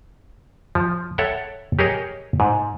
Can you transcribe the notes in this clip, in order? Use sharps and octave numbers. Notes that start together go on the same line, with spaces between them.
F3
A4 C#5 E5 F#5 G5
G4 G#4 A#4 C#5 D#5
G#2